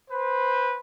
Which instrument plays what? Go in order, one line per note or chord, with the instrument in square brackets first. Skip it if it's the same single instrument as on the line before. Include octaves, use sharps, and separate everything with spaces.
[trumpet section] B4 C5